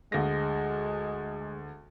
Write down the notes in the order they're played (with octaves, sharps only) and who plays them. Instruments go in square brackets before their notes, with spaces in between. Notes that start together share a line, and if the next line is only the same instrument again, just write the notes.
[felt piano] D2 A#6 [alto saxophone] G#3